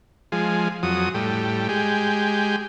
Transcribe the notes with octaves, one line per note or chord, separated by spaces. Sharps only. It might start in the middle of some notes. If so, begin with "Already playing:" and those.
F3 G#3
F2 F#3 D#6
A2 G3
G#3 G4